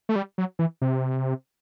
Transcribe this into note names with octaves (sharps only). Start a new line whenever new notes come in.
A3
G3
F#3
E3
C3